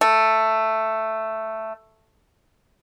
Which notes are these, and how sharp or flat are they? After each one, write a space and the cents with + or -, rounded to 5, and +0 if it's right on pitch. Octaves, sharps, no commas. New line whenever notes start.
A3 +5